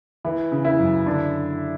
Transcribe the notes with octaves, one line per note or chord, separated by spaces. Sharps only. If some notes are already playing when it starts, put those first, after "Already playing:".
E3 E4
C#3
E4
F#2
D3 D4